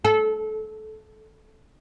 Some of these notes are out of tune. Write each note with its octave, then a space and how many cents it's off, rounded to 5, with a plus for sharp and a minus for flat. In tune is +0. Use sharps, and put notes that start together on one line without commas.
A4 -25